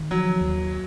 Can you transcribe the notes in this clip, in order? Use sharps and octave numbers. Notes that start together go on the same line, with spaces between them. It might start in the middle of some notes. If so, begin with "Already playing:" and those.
Already playing: D#3
F3 F#3
D#2